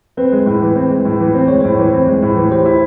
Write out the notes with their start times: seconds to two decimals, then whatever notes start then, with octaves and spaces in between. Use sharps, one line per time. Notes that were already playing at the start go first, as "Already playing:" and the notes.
0.17 C4 B4
0.32 G#3
0.46 A2
0.62 E3
0.76 C4
0.90 G#3
1.05 A2
1.20 E3
1.35 C4
1.48 G#3 C#5
1.61 A2 C5
1.74 E3 C#5
1.93 C4
2.07 G#3
2.22 A2
2.36 E3
2.51 G4 C5
2.66 E4